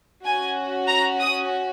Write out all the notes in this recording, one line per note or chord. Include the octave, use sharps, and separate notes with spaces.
C#4 F#4 G#5
A#5
D#6